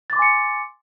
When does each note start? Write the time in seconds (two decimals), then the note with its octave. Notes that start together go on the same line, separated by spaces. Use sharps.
0.10 A6
0.13 D6
0.16 C6
0.19 G#5
0.22 C#7